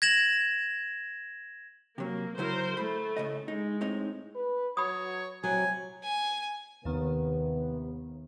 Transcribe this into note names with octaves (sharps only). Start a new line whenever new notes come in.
G#6 A#6 E7 F#7
C3 F#3 A#3
C#3 F#3 E4 A#4 C5
A3 B5
A2 C#3 D#5
G#3 D#4
A2 C4 D#4
B4
F#3 C#5 B5 D#6
C3 F#3 G#5
G#5
D#2 C3 D#3 B3